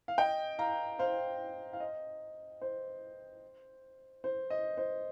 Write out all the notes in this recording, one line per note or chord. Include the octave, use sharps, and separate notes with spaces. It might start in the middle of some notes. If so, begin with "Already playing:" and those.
F5
D#5 G5
F5 A#5
C5 F5
F5
D#5
C5
C5
D#5
C5